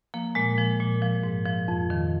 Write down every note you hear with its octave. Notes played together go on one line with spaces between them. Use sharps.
F3 A#3
A#2 G#3
F3
A#2
F3
G#2
F3
F2
D#3